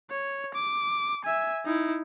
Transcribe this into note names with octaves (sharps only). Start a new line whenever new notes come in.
C#5
D6
E5 G#5
D#4 E4